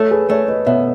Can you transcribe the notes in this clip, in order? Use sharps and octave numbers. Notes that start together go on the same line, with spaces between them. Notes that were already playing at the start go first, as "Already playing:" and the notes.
Already playing: A3 A4 C#5
G#4 B4
A3 A4 C#5
B4 D#5
B2 C#5 E5